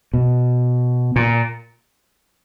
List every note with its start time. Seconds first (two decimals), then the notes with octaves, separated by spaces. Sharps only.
0.14 B2
1.16 A#2